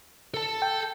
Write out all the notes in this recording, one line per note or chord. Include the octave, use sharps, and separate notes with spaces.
A4 A5
G5